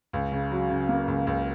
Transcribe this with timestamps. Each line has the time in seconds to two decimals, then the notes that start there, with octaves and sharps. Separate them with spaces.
0.13 C#2
0.32 C#3
0.51 F#3
0.70 C#3
0.89 A#3
1.08 C#2
1.27 C#2